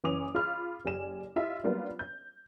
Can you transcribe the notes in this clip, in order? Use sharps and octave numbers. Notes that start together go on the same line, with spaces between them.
F#1 E3 C#4 D6 D#6 F7
F4 G#4 B5 F6
F#1 G4 D5 G#5 E7
E4 F4 G4 D#5 E5
F#3 G3 A#3 B3 D4 F4
G6